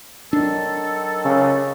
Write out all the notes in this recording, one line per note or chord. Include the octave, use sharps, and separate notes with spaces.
D#3 F#3 D4 A4
C#3